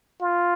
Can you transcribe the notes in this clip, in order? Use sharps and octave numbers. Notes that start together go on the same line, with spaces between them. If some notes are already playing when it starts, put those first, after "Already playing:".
F4